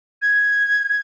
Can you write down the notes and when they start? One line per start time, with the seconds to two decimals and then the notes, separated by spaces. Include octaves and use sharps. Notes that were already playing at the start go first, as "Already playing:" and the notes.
0.22 G#6